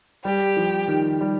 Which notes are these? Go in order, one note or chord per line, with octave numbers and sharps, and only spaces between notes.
G3 G4
F3
D#3
G3